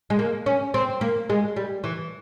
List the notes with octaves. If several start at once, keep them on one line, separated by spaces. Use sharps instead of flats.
G#3
A#3
C#4
C4
A#3
G#3
G3
E3